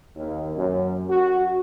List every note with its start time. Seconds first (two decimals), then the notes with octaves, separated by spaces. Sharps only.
0.16 D#2
0.56 F#2
1.09 F#4